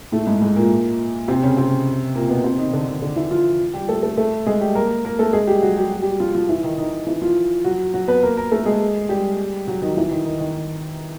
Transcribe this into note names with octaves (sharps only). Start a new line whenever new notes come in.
A2 A3
G#2 G#3
G#2 G#3
A#2 A#3
C3 C4
C#3 C#4
C3 C4
A#2 A#3
B2 B3
C3 C4
D#3 D#4
D3 D4
D#3 D#4
D3 D4
E3 E4
F3 F4
G3 G4
A3 A4
A3 A4
A3 A4
G#3 G#4
G3 G4
A#3 A#4
A#3 A#4
A3 A4
G#3 G#4
G3 G4
F#3 F#4
G4
F#4
G3 G4
F3 F4
F3 F4
E3 E4
D#3 D#4
D#3 D#4
E3 E4
F3 F4
F#3 F#4
F#3 F#4
B3 B4
A#3 A#4
A#3 A#4
A3 A4
G#3 G#4
G3 G4
F#3 F#4
D#3 D#4
E3 E4
D#3 D#4
D#3 D#4
D#3 D#4